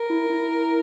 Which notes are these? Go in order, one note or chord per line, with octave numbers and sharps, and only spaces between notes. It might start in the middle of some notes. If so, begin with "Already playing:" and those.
Already playing: A#4
E4
E4